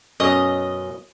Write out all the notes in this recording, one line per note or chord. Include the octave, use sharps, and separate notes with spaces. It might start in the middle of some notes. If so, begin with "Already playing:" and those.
F#2 B2 C#4 D#5